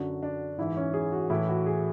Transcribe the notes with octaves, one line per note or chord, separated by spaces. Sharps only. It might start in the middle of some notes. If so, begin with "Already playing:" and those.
Already playing: F#2 D3 F#4
D4
G#2 E3 E4
C#4
G#4
F#4
A2 E3 E4
F#4
G#4